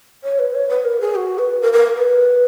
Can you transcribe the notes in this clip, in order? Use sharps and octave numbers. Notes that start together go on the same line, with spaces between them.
C#5
B4
C#5
B4
A#4
G#4
F#4
B4
A#4
A#4
B4